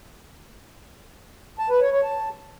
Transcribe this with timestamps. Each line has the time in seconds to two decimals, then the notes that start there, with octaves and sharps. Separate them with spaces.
1.59 A5
1.70 B4
1.81 C#5
1.92 C#5
2.03 A5